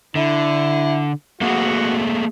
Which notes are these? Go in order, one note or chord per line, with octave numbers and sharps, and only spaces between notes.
D3 E4
A3 A#3 F#4 G#4 F#5